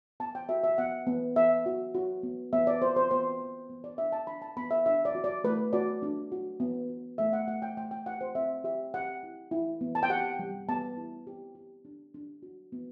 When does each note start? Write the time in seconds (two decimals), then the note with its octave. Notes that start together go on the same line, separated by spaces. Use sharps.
0.20 B3 A5
0.35 G5
0.49 F#4 E5
0.64 E5
0.78 B3 F#5
1.07 B3
1.36 B3 E5
1.66 F#4
1.95 F#4
2.23 B3
2.53 B3 E5
2.67 D5
2.82 F#4 C5
2.96 C5
3.11 B3 C5
3.40 B3
3.69 B3
3.84 D5
3.98 D4 E5
4.12 A5
4.27 D4 B5
4.42 A5
4.57 B3 B5
4.71 E5
4.86 D4 E5
5.05 D5
5.15 F#4
5.24 D5
5.44 A3 B4
5.73 F#4 D5
6.02 D4
6.32 F#4
6.60 B3
6.89 F#4
7.18 A3 E5
7.33 F#5
7.48 A3 F#5
7.62 G5
7.77 A3 G5
7.91 G5
8.06 G4 F#5
8.21 C5
8.35 C4 E5
8.64 G4 E5
8.94 G4 F#5
9.23 E4
9.51 E4
9.81 B3
9.95 A5
10.03 G5
10.10 G4 F#5
10.39 G3
10.69 B3 A5
10.97 E4
11.27 G4
11.55 G4
11.85 D4
12.14 D4
12.43 F#4
12.72 B3